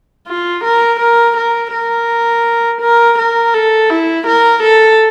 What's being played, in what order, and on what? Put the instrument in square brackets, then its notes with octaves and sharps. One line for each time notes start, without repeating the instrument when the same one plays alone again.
[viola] F4
A#4
A#4
A#4
A#4
A#4
A#4
A4
E4
A#4
A4